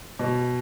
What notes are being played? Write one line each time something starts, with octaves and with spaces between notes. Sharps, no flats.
B2